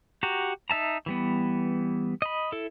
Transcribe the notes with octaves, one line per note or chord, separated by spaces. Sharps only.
F#4 G4 A#5
D#4 E5 A5 A#5
E3 G3 B3
D#5 B5
E4 A4